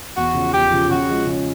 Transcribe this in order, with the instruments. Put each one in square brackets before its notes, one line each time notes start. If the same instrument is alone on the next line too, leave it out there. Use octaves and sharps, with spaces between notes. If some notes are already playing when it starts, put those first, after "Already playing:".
[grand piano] E2 [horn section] F#4
[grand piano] C#3 F3
[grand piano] E2 [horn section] G4
[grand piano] C#3 F3
[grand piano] C#3 [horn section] F#4
[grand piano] F3 G#3
C#3